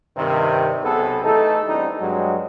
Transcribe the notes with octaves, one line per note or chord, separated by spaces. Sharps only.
G2 C3 D#3
B1 C3 B3 G#4 A4 B4
E3 A3 D#4 A4
E2 E3 G3 C4 D4 D#4
G2 F#3 G#3